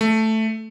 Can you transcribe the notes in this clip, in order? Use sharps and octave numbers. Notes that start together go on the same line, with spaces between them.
A3